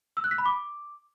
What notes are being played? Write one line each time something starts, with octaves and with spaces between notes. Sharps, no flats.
E6
F#6
B6
B5
D6